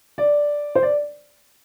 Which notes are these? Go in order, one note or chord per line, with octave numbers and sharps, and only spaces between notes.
D5
C5
D5